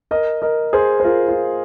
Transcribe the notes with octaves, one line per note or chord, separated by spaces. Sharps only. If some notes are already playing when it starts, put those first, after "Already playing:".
A#4 D#5
A#4 D#5
G#4 C5
C5
F4 A#4
F4